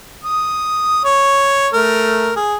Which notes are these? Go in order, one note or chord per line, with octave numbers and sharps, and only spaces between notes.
D#6
C#5
A3 A#4
G#4